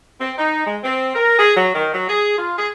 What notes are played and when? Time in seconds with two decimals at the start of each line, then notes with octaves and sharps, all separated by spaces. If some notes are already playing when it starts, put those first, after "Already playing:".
0.20 C4
0.38 D#4
0.67 G#3
0.83 C4
1.15 A#4
1.39 G#4
1.56 F#3
1.75 D#3
1.93 F#3
2.09 G#4
2.38 F4
2.58 G#4